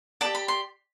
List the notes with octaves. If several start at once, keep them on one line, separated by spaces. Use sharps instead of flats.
G4 D5 A5
B5
C6